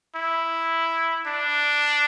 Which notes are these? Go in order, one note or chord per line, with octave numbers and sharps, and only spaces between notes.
E4
D4